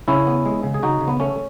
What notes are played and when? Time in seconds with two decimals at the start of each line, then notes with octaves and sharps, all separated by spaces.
0.08 C#3 C#4 E4
0.27 B3
0.45 G#3
0.63 C#3
0.74 G#4
0.82 C#3 D#4 F#4
1.01 C#3
1.08 B3
1.20 A3 C#4